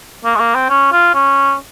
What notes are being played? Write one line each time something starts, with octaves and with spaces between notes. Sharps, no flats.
A#3
G#3
A#3
C4
C#4
F4
C#4